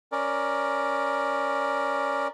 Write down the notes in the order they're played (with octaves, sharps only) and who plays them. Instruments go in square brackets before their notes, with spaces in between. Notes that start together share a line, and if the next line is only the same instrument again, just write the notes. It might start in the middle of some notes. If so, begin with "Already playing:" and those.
[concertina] C#4 A#4 D5